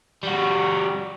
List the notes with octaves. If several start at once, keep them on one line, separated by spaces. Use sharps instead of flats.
G3 F#4